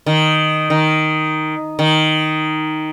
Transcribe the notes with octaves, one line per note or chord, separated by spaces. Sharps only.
D#3
D#3
D#3